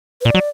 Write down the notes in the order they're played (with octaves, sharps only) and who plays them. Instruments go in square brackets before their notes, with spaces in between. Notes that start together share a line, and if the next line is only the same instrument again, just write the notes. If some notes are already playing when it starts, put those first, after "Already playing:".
[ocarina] B4
[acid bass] A#2 [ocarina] D5
[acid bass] F#3